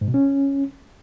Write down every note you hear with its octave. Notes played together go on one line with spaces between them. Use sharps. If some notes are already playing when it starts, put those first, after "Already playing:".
G#2
B2
C#4